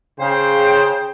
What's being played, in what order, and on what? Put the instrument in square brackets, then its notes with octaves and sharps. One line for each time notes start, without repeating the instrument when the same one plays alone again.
[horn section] C#3 C5 G5